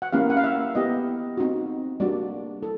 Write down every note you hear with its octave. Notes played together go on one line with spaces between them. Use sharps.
F#5
A#3 C#4 E4 G4 F5
F#5
F5
E5
B3 E4 G4 D#5
C4 D#4 F#4
G3 A#3 D4 F#4 D5
E4 A4